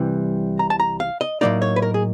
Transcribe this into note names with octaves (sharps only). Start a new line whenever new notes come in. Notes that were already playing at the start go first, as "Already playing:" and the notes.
Already playing: C2 C3 E3 G3
A#5
A5
A#5
F5
D#5
A2 F#3 A#3 D#4 D5
C#5
B4
A#4
G#4